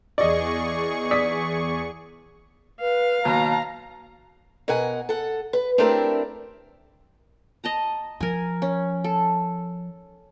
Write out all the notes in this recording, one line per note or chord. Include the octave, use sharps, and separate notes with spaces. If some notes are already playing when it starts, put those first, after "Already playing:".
E2 G#4 D5 D#5 C#6
D5 D#6 B6
B4 F5
D#2 B2 F#3 A5 A#5
B2 A#4 F#5 G#5
A4 F#5
B4
A3 C4 D4 E4 G4 A#4
D#5 A5 A#5
F3 A#4 G#5
C#4
A4